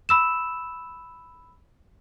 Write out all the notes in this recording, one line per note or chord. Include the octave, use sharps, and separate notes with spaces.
B5 E6 E7